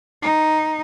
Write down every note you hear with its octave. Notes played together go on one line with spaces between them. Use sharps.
D#4